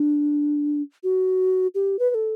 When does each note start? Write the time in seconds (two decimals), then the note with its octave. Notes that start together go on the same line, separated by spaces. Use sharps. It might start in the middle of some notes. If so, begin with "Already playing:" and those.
Already playing: D4
1.04 F#4
1.75 G4
1.99 B4
2.10 B4
2.14 A4